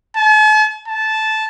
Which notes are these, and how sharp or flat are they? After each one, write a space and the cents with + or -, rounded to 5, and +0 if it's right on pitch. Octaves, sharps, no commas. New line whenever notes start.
A5 -45
A5 -10